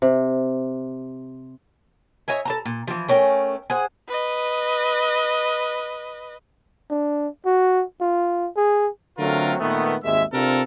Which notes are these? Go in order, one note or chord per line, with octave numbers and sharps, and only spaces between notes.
C3
C#5 D#5 E5 G#5
A4 A5 A#5
A#2
E3 F3
A3 C#4 A#4 G5
G#4 C5 F#5
B4 D#5
D4
F#4
F4
G#4
D3 F#3 A3 C4 F4 A#4
A#2 D#3 A3 B3
G#1 D#2 G#3 E5
C3 C4 D4 F4 A4 A#4